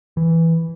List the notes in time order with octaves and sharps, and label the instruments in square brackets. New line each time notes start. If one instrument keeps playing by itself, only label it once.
[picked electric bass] E3